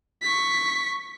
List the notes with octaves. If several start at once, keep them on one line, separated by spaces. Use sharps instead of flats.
C#6 B6